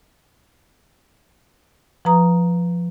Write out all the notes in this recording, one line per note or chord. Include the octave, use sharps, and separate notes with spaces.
F3 B4 A#5 D#6